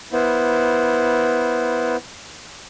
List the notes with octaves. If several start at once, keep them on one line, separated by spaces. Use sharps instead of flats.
B3 E4 C5